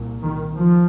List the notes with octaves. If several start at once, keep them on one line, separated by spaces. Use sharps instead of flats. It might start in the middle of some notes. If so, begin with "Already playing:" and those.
Already playing: C2 A#2
D#3
F3